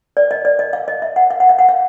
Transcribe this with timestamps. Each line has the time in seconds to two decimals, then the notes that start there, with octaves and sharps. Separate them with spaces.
0.17 D5
0.31 D#5
0.45 D5
0.59 D#5
0.73 F5
0.88 D#5
1.02 E5
1.16 F#5
1.31 F5
1.40 F#5
1.49 F5
1.59 F#5
1.69 F5